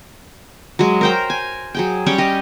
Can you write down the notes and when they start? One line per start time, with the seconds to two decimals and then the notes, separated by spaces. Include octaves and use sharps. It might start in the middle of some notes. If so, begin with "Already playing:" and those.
0.79 F#3 G#3
1.01 A#4 C5 G5
1.30 G#5
1.75 F#3 G#4 G5
2.06 G3 C#4 C#5 G5
2.18 G4 D#5